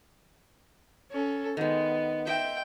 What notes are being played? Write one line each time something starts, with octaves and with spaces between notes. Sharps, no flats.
C#4 A4
D#3 G#3 B3
C5 D#5 E5 G5